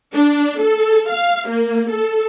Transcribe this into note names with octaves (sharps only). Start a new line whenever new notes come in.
D4
A4
F5
A#3
A4